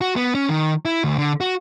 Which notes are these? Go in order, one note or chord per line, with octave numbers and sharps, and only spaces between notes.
F#4
B3
C#4
D#3
E4
D2
D3
F#4